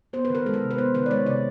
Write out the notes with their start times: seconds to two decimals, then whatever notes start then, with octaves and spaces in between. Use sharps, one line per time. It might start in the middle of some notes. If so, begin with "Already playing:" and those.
0.13 B3 C5
0.25 B4
0.30 D#3 A#4
0.46 G#3 A4
0.54 A#4
0.62 C3
0.71 B4
0.78 B3 C5
0.94 D#3 B4
1.06 D5
1.11 G#3 C#5
1.26 C3 D5